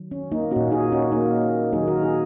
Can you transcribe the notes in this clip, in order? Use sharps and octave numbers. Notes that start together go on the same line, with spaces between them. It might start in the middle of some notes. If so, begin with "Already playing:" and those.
Already playing: D#3 F#3
C#4
A#3 D#4
A#2 A#3 C#4 F#4
D#4 G#4
C#4 F#4
A#3 D#4
D#3 F#3 A#3 D#4 G#4
F#4 A#4
D#4 G#4